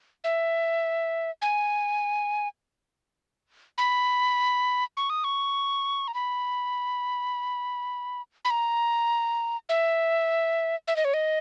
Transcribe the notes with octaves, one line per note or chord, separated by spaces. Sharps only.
E5
G#5
B5
C#6
D#6
C#6
A#5
B5
B5
A#5
E5
E5
D#5
C#5
D#5